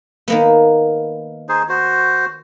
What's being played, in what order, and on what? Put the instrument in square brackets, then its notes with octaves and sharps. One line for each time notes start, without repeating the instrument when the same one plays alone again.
[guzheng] D#3 A#3 B3
[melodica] D#4 G#4 C5
F#4 C5